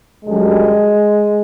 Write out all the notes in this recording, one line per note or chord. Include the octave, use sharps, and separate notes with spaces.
F#2 D3 G3 G#3